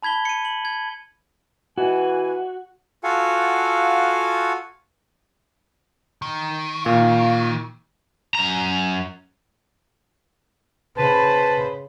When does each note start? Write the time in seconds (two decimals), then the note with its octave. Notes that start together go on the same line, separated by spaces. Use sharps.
0.02 A5 B5 G#6 B6 G7
0.25 C#7 D#7
0.45 F#7
0.65 G#6
1.78 B2 E3 F#4 G#5
3.04 F4 F#4 A4 F5 F#5 G#5
6.22 D#3
6.86 A#2 F5
8.35 F#2 A#5
10.97 C#3 B4 C5 A5 B5